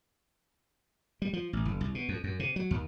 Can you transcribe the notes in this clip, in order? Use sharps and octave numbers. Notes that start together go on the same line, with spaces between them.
G3
F3
A1
F#1
C2
B2
F2
F#2
C3
F#3
D#2